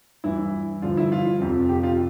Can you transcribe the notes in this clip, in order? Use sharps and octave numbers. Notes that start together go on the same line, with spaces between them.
G2 E3 E4
G2 D3 F3 F4
E4
F4
F2 C3 F3
G4
F4